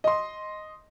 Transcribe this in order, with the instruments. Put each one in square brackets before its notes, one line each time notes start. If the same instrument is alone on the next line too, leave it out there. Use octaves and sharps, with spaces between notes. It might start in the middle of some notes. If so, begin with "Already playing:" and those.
[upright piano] D#5 C6